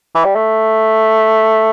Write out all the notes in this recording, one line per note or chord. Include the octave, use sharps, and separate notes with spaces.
E3
G3
A3